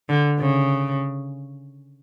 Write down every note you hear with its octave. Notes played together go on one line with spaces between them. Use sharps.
D3
C#3